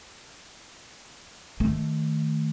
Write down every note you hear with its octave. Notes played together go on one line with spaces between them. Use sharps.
D#3 A3